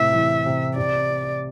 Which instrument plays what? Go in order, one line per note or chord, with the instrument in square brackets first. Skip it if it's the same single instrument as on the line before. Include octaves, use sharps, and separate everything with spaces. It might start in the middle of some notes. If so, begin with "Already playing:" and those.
Already playing: [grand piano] A2 C3 [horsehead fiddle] E5
[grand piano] E3
C3
[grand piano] C3 [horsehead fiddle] D5